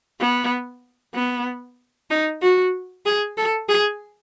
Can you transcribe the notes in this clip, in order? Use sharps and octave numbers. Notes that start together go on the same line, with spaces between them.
B3
B3
D#4
F#4
G#4
A4
G#4